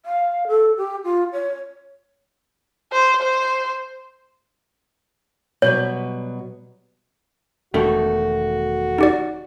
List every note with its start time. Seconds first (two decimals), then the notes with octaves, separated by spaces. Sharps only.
0.06 F5
0.48 A4
0.77 G4
1.04 F4
1.33 C#5
2.92 C5
3.22 C5
5.62 B2 F#3 G3 C#5
7.74 E1 B2 D#3 A3 F#4
8.98 D#4 G4 D5